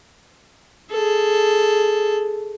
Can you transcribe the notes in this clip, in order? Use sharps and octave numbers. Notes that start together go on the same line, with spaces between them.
G#4 A4